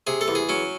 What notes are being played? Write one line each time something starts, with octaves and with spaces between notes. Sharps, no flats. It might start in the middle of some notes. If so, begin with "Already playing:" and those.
C3 G#4
A4
E2
G#4
F#3 C#4